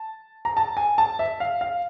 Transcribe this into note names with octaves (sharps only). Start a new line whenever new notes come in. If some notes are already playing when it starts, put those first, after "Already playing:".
Already playing: A5
A#5
A5
G#5
A5
E5
F5
F5